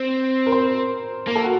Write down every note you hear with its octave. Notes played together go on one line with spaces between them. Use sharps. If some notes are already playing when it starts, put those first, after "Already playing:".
Already playing: C4 C5
A#4
C5
A#3 A#4
A4
F#4